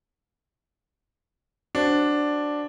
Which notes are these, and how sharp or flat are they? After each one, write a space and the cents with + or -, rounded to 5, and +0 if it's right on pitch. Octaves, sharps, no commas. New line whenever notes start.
D4 +0 F#4 +5 C5 +0